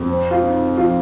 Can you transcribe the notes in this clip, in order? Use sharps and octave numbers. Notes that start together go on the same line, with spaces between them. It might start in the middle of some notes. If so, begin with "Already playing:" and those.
Already playing: F2
C4
F4
D#4
F3 F4